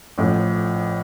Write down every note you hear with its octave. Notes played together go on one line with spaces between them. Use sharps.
A1 A2 F3